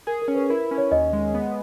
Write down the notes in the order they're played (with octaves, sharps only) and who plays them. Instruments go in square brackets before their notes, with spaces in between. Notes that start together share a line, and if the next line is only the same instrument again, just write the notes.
[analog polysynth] G#4 [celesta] A#4
[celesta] A#4
[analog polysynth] C#4
[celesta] B4
[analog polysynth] E4 [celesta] A#4
[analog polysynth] C#4
[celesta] C#5
[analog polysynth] D#2 [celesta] D#5
[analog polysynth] G#3
B3